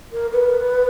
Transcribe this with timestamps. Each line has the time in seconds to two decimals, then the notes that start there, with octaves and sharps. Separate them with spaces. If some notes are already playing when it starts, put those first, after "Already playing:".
0.12 A#4
0.33 B4